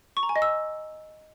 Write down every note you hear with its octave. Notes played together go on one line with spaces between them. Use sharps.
C#6
A#5
G#5
D#5
E6